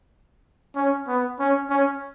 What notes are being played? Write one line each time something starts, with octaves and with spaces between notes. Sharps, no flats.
C#4
B3
C#4
C#4